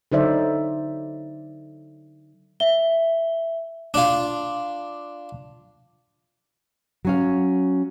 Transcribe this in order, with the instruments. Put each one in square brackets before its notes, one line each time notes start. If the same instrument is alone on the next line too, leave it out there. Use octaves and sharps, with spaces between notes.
[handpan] D3 F#3 D#4 C5 D5 E5
[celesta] E5 G7
[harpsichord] D4 F4
[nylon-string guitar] F#3 C#4 F5